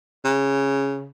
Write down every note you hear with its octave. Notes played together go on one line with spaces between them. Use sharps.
C#3